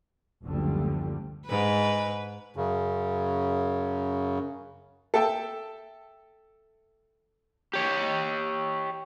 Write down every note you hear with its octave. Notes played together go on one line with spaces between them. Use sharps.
F#1 D2 D3 F3 G3
G#2 B4
F#2 C#3
A4 E5 G5 A5
G4 C#5